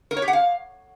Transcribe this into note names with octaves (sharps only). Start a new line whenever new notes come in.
A#4
C#5
G4
F#5
F5